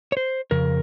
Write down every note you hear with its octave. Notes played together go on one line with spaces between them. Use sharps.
C#5
C5
F2 C#3 A#4